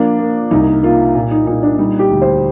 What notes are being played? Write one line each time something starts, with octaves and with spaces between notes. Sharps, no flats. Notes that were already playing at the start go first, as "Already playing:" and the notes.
Already playing: F3 A#3 D4
A#3
C2 D#4
A#3 F4
A#2
D#4
A#2 D#4
D4
G3 D#4
G4
D2
C5